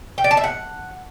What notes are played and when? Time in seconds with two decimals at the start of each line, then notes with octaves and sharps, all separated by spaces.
0.18 G5
0.24 D5
0.31 A5
0.37 E5
0.44 F#5